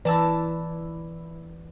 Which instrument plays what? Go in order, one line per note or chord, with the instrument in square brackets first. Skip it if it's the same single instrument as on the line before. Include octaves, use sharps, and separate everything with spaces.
[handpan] E3 B4 D5 [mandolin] E4 A5 A#5